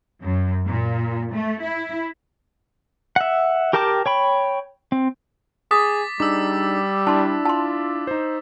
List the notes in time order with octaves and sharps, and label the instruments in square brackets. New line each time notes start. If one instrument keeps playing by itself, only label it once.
[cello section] F#2
A#2
A3
E4
[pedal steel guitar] E5 F#5
G4 A#4 G5 A5 D6
C#5 G5 B5
C4
[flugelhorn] G#4 [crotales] D6 A6 B6 [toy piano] D#6
[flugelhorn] G3 [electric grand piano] D4 D#4 G#4 [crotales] D6 E6
[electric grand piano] D4 E4 [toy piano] A5 C6
[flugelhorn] F4 [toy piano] A5 C6
[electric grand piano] D#4 C5